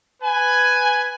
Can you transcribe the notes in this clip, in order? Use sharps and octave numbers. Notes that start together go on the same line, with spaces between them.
B4 G#5